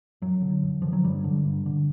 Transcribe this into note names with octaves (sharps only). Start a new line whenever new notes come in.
F#2 F#3
D3
F#2
D3 F3
F#3
G2 G3
D3
G2
D3